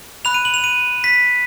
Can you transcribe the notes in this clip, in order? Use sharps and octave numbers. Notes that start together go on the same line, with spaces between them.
B5 F#6 F7
D#7
F#7
F7
D#7
B6